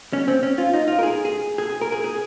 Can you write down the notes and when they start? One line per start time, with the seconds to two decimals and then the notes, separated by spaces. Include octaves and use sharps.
0.13 C#4
0.28 C4
0.43 C#4
0.58 F4
0.74 D#4
0.88 F4
0.99 A#4
1.03 G#4
1.25 G#4
1.58 G#4
1.70 G#4
1.81 A#4
1.92 G#4
2.04 G#4